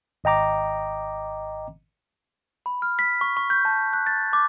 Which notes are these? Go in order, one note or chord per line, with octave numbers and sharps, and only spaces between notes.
G#1 D#5 G5 A#5 D6
B5
F6
B6
C#6
C#6
G6
A5
F#6
A6
D6